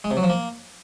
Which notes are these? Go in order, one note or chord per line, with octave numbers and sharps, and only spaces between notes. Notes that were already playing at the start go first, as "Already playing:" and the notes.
G#3
C3
F#3
F3
A#3